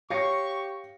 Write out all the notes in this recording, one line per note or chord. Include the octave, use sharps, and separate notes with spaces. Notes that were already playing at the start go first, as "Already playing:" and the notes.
G4 C#5 F5 C#6 A#6 C#7